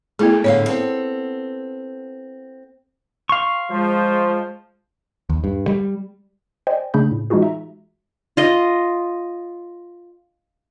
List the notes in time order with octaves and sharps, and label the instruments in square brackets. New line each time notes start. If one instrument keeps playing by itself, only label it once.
[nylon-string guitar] A3 [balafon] B3 E4 G#4
[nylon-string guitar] A2 D3 F5 [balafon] C#5
[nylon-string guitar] B3 C4 A4
[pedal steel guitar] F5 C6 C#6
[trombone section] F3 C5 [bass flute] G#3
[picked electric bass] D#2
G2
G3
[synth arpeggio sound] C5 D5 D#5 G5 G#5
C#3 A3 D4 G#4 B5 G6
A2
E3 G#3 D#4 F4 F#4 G#4
E5 A#5
[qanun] F4 D#5